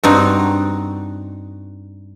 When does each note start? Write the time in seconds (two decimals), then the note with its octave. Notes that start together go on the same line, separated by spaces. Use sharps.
0.03 G2 C4 D#4 F#4